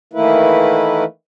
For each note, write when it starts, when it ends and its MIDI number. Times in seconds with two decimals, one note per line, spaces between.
0.13 1.04 51
0.13 1.04 52
0.13 1.04 57
0.13 1.04 58
0.13 1.04 64
0.13 1.04 71